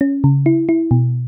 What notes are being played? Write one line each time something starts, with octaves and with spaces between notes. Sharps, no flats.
C#4
C#3
E4
E4
B2